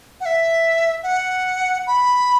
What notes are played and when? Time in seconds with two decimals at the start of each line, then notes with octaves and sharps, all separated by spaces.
0.20 F#5
0.25 E5
1.03 F#5
1.87 B5